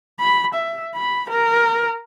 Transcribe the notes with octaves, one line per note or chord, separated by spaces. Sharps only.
B5
E5
B5
A#4